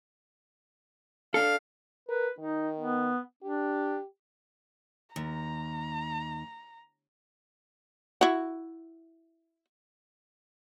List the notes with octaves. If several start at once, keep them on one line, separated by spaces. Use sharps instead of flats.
D4 A4 F5
A#4 B4
D#3 D#4
B3
D4 G4
D#2 A#5
E4 F#4